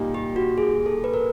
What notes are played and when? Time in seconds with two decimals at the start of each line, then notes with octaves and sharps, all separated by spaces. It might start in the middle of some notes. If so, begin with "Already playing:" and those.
Already playing: A#2 G3 A#3 D#4
0.14 G4
0.36 F#4
0.58 G#4
0.86 A4
1.04 B4
1.14 A#4